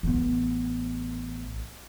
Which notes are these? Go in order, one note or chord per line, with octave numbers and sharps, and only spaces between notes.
A1 B3